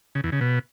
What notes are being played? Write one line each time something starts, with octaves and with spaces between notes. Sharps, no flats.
C#3
E2
C#3
B2